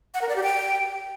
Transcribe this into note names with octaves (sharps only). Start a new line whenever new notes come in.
F#5
A#4
D5
G4
G5